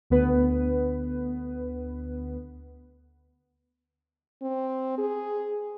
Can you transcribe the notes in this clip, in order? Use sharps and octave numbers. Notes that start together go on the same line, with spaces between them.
D2 D3 B3 B4
C4
G#4